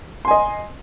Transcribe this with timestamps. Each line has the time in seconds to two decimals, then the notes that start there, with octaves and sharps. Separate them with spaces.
0.25 C6
0.28 G#5
0.31 D#5